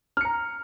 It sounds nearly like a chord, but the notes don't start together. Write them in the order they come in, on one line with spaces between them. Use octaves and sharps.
F6 C#7 A#5